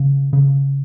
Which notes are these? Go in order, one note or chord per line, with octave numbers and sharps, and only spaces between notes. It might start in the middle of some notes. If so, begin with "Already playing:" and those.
Already playing: C#3
C#3